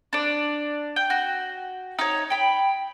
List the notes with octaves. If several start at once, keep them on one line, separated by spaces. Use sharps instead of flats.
D4 D5
G5
F#4
D#4 C#5
G5 B5